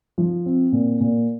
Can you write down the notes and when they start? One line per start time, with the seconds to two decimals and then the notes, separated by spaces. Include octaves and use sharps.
0.18 F3
0.46 C4
0.72 A#2
1.00 A#2